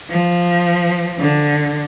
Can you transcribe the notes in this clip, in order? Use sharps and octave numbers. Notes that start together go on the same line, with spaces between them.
F3
D3